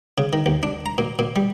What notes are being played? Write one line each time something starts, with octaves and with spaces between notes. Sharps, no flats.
C#3
D#3
D#2
D4
A#5
A#2
A#2
G3